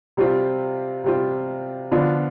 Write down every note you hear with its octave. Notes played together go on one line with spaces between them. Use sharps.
C3 G3 C4 F4
C3 G3 C4 F4
D3 F3 B3 D4 F4